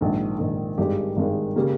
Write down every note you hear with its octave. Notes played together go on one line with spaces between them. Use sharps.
A#1 G#2 D#3
A#1 G#2 D#3
G#1 G2 D#3 G#3 G4
G#1 G2 D#3 G#3
C#3 G3 A#3